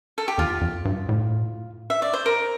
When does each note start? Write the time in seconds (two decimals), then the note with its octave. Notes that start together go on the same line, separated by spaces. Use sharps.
0.18 A4
0.28 G4
0.38 E2 F4
0.61 F2
0.85 G2
1.09 A2
1.90 E5
2.02 D5
2.13 C5
2.26 A#4